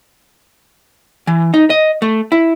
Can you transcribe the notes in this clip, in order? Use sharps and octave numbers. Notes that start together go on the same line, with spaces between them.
E3
D#4
D#5
A3
E4